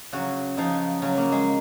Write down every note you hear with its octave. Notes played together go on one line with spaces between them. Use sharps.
C#3 F#3 F#4
C#3 F3 D#4
C#3 F#3 C#4
A#3
G#3